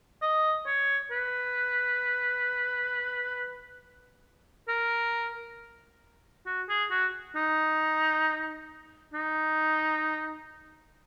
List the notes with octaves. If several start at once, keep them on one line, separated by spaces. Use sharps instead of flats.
D#5
C#5
B4
A#4
F#4
G#4
F#4
D#4
D#4